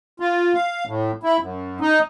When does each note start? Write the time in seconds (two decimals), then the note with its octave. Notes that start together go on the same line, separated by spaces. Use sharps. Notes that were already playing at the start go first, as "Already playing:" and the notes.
0.20 F4
0.54 F5
0.86 A2
1.23 E4
1.40 F#2
1.81 D#4